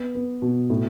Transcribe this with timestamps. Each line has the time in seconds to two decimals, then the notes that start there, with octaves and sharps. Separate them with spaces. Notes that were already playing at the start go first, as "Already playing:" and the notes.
Already playing: B3
0.15 B3
0.42 B2
0.70 A2